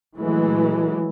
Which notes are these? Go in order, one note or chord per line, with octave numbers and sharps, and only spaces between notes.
A#2 E3 F#3 G#3 A3